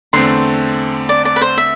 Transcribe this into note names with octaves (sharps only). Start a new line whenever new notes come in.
E2 D3 A3 C4 C6
D5
D5
B4
C5
E5